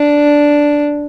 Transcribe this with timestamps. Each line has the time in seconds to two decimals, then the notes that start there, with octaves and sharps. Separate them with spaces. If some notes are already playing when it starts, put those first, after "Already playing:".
Already playing: D4